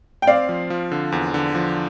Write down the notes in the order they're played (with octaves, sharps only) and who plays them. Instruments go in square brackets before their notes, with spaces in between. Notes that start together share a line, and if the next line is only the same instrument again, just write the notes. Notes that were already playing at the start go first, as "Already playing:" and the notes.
[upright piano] G5
[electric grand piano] C4 [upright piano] D5 F5
[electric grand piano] F3
F3
D3
E2
D3
F3